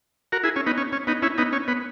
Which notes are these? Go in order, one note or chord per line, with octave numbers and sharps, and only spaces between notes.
F#4 A#4
E4 G#4
C#4
B3 D#4
C#4
C#4
B3 D#4
C#4 E4
B3 D#4
C#4
B3